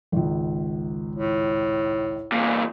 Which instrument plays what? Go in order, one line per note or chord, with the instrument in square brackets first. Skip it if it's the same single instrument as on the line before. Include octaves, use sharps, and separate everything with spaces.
[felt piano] G#1 C#2
[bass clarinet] A2
[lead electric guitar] E2 A#2